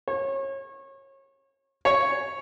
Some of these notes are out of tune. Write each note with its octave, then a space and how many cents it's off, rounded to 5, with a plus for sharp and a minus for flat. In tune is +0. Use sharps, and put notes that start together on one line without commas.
C#5 -30
C#5 +0